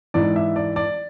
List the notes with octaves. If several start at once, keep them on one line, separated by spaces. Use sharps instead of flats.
G#2 E3 D5
E5
D5
D5